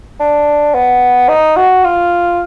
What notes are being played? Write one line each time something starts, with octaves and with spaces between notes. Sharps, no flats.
D4
B3
D#4
F#4
F4